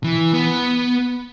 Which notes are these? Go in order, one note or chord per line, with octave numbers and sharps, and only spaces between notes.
E3
B3